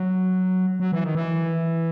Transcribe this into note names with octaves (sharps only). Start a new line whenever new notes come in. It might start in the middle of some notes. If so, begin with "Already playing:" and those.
Already playing: F#3
F#3
E3
D#3
E3